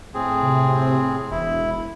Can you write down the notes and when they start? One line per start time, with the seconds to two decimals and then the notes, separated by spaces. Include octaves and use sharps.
0.14 A2 C4 G#4
0.43 C3
1.31 E1 E4